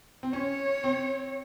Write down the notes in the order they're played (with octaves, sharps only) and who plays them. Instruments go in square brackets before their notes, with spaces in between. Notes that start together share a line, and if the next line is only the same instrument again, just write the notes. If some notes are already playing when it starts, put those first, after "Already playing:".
[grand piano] C4
[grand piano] C#4 [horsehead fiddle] C#5
[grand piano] C4